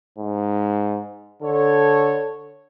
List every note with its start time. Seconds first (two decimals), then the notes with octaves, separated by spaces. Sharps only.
0.19 G#2
1.42 D3 A4 C#5